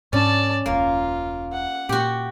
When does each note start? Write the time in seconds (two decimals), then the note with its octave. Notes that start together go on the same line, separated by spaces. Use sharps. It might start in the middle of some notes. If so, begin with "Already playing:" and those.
0.13 G#2 C#4 D4 D5 A5
0.66 E1 C#2 A#3 F4
1.52 F#5
1.89 A#2 F#4 G4